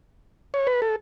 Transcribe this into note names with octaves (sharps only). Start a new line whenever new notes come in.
C#5
B4
A4